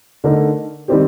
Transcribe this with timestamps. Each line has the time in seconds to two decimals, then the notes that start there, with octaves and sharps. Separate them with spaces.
0.24 D3 A3 D#4 A#4
0.88 D#3 G3 C4 D#4 G4